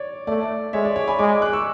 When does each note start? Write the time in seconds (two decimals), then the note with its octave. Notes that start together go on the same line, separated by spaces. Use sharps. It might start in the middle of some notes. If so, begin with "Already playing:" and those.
Already playing: C#5 D5
0.27 A3 D5
0.73 G#3 C#5 E5
0.85 D5
0.96 C#5
1.08 G#5 B5
1.19 G#3 B5 D6
1.42 D6 F#6
1.53 C#6 E6